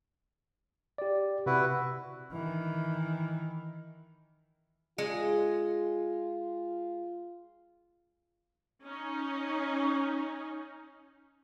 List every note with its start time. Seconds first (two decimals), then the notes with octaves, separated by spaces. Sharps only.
0.98 G4 D5
1.46 C3 E4 F#4 B4
2.32 D#3 E3
4.98 G#3 F4
8.84 C#4 D#4